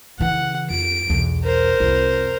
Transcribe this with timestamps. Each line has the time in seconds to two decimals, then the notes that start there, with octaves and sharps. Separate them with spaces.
0.20 C#3 E3 F#5
0.70 F2 D7
1.10 B1 E2
1.44 A#4 C5
1.80 C2 F2